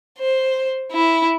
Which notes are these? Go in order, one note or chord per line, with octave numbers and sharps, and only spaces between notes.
C5
E4